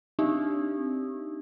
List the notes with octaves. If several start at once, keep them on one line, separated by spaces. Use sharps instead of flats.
C4 D4 D#4 G4